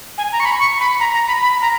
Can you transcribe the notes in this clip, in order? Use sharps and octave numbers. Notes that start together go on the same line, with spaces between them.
G#5
A#5
C#6
B5
C#6
B5
A#5
A#5
B5
B5
A#5